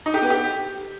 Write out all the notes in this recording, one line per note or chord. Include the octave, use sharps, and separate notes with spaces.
D#4
G4
B3
G4